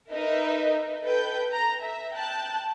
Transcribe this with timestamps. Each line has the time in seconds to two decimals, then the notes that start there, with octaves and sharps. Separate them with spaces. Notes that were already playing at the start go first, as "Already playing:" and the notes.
0.12 D#4 A#4 B4 D#5 E5
1.04 A4 B4 G5 G6
1.52 A#5
1.83 E5
2.15 G5 A5 F#6